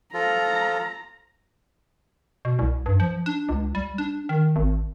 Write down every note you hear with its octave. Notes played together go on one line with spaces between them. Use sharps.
F3 F4 A4 A#5
B2
C2
G2
F3
D4
C#2
G3
D4
D#3
G#1